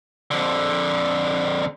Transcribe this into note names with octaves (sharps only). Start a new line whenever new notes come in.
F2 D3